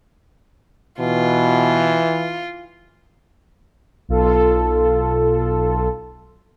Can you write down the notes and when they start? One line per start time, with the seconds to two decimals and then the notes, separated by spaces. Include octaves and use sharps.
1.00 B2 E3 F4
4.09 B1 F4 A4